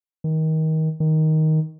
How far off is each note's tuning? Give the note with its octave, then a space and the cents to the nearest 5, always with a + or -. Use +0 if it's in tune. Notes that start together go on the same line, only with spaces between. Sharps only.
D#3 +25
D#3 +10